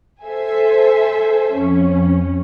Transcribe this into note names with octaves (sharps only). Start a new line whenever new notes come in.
A4 C5 E5 G#5
F2 C#4